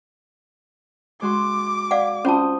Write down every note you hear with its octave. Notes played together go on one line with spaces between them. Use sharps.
G#3 F#4 C6 D6
D5 F5 F#5
C#4 F4 C5 A5 D#6